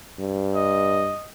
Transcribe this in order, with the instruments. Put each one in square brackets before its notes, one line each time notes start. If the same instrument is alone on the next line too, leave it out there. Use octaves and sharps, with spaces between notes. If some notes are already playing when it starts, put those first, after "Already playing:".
[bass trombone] G2
[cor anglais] D#5